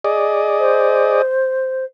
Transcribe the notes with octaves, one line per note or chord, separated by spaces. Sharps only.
G#4 D5 D#5
C5